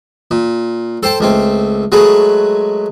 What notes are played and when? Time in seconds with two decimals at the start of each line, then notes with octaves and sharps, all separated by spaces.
0.31 A#2
1.03 A4 C5 G5 A5
1.20 C#2 A3 C4
1.92 F#3 G#3 A3 B4